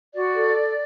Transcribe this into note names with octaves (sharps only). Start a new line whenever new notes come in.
F#4 D5
A4